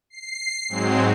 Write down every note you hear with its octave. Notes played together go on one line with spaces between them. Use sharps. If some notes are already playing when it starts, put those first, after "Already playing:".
C7
G#2 F#3 G#3 C4